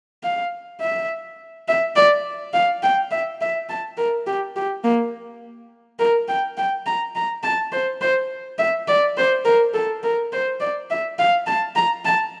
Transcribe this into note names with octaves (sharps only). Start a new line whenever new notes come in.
F5
E5
E5
D5
F5
G5
E5
E5
A5
A#4
G4
G4
A#3
A#4
G5
G5
A#5
A#5
A5
C5
C5
E5
D5
C5
A#4
A4
A#4
C5
D5
E5
F5
A5
A#5
A5